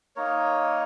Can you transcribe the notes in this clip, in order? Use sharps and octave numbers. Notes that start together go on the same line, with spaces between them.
A#3 D#4 A#4 C#5